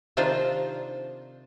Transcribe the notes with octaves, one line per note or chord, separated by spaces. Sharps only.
C3 D#3 D4 D#4 F4 C5